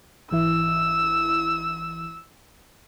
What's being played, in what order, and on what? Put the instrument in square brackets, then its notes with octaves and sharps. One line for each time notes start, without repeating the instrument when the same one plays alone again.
[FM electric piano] G#1 E3 E4 [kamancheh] E6